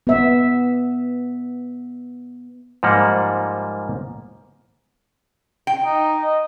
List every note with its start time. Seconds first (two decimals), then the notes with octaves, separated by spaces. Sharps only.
0.07 B3 E5
2.83 G#2 F3 G3 A#3 F#5
5.67 G5
5.85 D#4
6.22 D#5